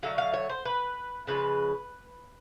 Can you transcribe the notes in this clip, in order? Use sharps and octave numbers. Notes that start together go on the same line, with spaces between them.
D3 F#3 A3 F5
F5
C#5
C5
B4
C#3 F3 G#3 B4